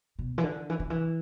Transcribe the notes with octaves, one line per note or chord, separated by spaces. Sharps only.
B2
E3
D3
E3
D3
E3